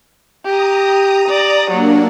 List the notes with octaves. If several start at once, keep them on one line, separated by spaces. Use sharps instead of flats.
G4 A#5 D#6
D5
F#3 A#3 D4